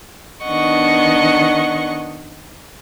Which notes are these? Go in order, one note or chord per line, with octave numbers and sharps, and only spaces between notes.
D#3 B3 D4 D#5 F#5 C#6